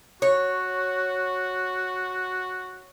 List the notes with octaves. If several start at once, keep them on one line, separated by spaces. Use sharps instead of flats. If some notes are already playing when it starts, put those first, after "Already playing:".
F#4 C#5